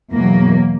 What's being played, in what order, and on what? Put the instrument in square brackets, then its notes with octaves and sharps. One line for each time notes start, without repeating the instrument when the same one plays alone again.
[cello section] E2 B2 F#3 A#3